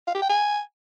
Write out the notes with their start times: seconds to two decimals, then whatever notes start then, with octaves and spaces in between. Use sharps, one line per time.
0.07 F5
0.15 G4
0.22 G5
0.29 G#5